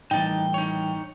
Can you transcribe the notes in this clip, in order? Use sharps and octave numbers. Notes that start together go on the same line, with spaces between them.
A2 E3 G3 D#4 G5 A5
D#4 C#5